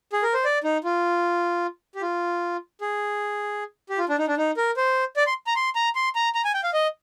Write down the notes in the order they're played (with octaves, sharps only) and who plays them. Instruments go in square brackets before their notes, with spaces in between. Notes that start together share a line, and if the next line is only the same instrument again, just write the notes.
[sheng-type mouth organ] G#4
A#4
C5
D5
D#4
F4
G4
F4
G#4
G4
F4
D4
D#4
D4
D#4
A#4
C5
D5
C6
A#5
C6
A#5
C6
A#5
A#5
G#5
G5
F5
D#5